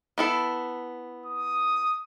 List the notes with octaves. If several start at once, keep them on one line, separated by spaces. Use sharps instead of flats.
B3 E4 A4
D#6